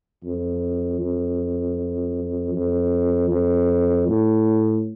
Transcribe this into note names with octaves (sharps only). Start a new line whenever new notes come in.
F2
F2
F2
F2
A2